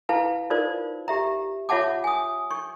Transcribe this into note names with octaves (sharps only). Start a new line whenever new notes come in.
E4 B4 F5 A5
D#4 F4 A#4 C5 D5
G4 E5 A#5
F4 C#5 E5 F#5 A5 D6
G#5 D#6
C#6